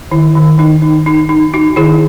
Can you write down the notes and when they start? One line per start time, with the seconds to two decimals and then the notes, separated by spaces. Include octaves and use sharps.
0.11 D#3 E4
0.35 D#3
0.58 D#3 D#4
0.82 D#4
1.06 D#4
1.29 D#4
1.54 D#4 F#4
1.76 D#3 E4 G#4